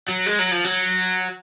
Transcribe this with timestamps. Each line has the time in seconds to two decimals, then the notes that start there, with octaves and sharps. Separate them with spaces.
0.08 F#3
0.26 G#3
0.39 F#3
0.51 F3
0.64 F#3